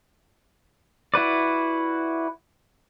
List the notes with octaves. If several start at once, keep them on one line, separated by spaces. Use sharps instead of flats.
E4 F#4 B4 D5